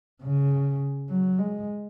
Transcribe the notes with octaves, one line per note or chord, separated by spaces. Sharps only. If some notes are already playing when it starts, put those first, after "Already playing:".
C#3
F#3
G#3